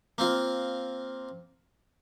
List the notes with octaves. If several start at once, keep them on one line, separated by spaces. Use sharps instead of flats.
A#3 C4 F4